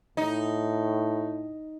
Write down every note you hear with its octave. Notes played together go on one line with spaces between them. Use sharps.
A2 D#4